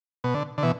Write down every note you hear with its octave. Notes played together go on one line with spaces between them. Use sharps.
B2
D3
D3
B2 E3